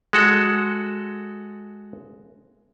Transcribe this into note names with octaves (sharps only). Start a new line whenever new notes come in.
G#3 F#4 A4